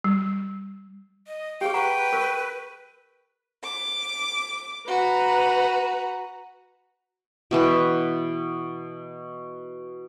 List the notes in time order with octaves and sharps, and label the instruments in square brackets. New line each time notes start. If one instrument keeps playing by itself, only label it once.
[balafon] G3
[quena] D#5
[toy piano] G4 G#4 [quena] F5 [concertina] G5
[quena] B4 [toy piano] F#5 A#5 C#6
[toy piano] A#4 C#6
[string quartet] D6
[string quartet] F#4 [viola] B4 A#5
[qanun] B2 E3 B4 G5